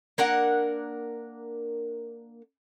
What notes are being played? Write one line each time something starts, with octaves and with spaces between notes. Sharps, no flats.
A#3 D4 A#4 F#5